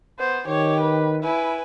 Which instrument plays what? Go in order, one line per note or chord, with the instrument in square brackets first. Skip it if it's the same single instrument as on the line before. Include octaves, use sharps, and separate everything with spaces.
[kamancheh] B3 [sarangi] C5
[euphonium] D#3 [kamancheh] G4 [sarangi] C#5
[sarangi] B4
[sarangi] E4 [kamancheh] B4 G#5